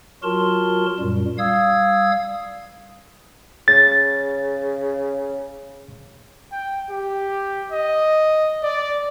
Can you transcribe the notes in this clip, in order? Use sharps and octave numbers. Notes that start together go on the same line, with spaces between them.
F#3 F4 F#4 A#4 A5 C6
F#2 A#2 G3
G3 F5 D#6 E6 G#6
C#3 A6
G5
G4
D#5
D5